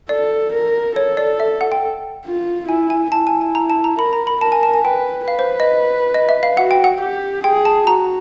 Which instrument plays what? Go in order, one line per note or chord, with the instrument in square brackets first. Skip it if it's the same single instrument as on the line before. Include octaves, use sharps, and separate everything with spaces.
[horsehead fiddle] A4 [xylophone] D5
[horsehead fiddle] A#4
[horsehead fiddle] A4 [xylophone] C#5
[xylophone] D5
E5
F#5
G5
[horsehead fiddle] F4
[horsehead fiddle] E4 [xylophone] G#5
[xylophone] G#5
[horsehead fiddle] E4 [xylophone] A5
[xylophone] G#5
A5
A#5
A5
A#5
[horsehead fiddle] A#4 [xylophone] B5
[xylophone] A#5
B5
[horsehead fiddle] A#4 [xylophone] A5
[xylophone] G#5
A5
G#5
[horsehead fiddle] B4 [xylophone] G5
[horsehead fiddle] B4 [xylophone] F5
[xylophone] C5
D#5
D#5
E5
F5
[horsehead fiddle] F#4 [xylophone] F#5
[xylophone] G5
F#5
[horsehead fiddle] G4
[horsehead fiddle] G#4 [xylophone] G5
[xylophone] A5
[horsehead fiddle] F#4 [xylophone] A#5